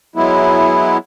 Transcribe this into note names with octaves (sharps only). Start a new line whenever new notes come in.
F#3 G#3 B3 E4